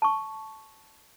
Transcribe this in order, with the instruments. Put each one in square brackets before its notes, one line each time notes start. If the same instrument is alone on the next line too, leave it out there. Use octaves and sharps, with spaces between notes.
[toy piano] A5 C#6